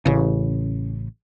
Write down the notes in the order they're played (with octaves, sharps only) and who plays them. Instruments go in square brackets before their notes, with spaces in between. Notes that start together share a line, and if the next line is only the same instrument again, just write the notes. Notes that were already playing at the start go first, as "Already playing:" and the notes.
[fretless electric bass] A1 C#3